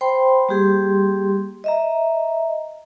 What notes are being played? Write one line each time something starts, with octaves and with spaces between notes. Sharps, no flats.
C5 G5 B5 C6
G3 A#3 G4 G#4 C6
D#5 E5 A#5